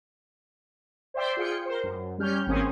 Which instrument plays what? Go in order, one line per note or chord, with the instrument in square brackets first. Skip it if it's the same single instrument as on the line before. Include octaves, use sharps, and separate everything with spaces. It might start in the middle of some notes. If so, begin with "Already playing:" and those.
[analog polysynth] C5 D5 E5 G5 C6
F4 G#4 G5 C#7
A#4 C5
F#2
G3 C#4 G4 F6 G6
G#1 A#3 C4 C#4 G#5 D#6